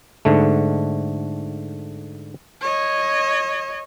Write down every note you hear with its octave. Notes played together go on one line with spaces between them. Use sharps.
G#2 D3 A3
C#5 D#5